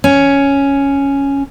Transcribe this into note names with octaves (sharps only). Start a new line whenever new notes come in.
C#4